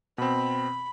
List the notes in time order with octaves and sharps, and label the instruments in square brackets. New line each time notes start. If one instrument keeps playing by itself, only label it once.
[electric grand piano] B2 C4 [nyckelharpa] B5